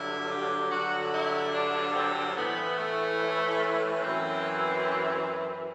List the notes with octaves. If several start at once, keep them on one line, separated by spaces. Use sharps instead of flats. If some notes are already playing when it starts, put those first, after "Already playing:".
Already playing: G2 D3 F#3 E4
G4
G2 D3 F#3 F#4
E4
D4
C4
A2 E3 B3
A3
F#2 E3 C4